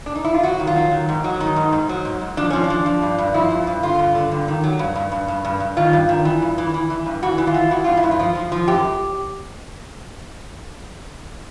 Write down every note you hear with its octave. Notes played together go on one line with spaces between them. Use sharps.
D4
D#4
E4
F4
F#3 F#4
D#3
F4
F#3
D#3
G#2
F#3
D#3 D#4
G#2
G#2
F#3
G#2
G#2
F3 D4
F3 C#4
D4
F3
F3
G2
G2
F3 E4
G2
G2
D3 F4
G2
D3
G2
D#3
F#3
G2
G2
G2
G2
G2
G2
D#3 F4
G2
D#3
E3
G2
E3
E3
E3
G2
E3 F#4
E3
F4
E3
E3 F#4
G2 F4
E4
G2
F4
F3
F3
F3
F#2 G4